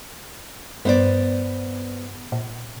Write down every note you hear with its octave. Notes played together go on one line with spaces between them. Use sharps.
G2 B3 C5 D5
A#2